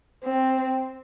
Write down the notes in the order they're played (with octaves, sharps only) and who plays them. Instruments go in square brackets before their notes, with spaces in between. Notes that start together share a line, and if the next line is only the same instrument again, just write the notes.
[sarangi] C4